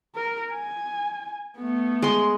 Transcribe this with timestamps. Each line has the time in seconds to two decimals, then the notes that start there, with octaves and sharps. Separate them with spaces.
0.15 A#4
0.53 G#5
1.57 A3 B3
2.02 G#3 C6